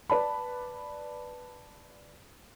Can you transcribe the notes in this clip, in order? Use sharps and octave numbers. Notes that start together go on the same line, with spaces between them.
B4 D5 A5 B5